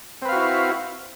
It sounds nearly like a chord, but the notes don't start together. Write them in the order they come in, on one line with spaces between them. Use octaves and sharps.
C4 B4 F5 F#4 E4